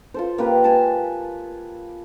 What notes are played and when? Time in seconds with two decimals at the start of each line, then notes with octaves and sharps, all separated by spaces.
0.14 F4 A4 C5
0.38 A#3 G4 B4 F5
0.64 G#5 A5